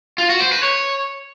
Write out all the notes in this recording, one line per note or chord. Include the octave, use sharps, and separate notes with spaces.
F4
F#4
C5
B4
C#5